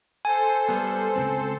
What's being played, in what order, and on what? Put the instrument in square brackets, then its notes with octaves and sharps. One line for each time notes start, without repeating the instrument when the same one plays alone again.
[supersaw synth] A4 C5 [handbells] G#5
[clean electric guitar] G3 B3
C#2 F#2 C4